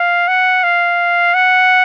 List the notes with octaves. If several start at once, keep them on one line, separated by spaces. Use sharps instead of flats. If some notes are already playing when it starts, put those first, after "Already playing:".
Already playing: F5
F#5
F5
F#5